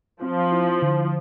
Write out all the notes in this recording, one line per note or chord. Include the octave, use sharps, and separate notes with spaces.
F3 C4
E4
D3